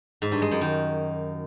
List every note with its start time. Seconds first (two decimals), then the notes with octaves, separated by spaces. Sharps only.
0.22 G#2
0.32 G2
0.42 G#3
0.51 F#2
0.61 D#3